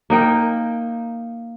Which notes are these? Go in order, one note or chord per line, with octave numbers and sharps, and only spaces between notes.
A#3 D#4 G5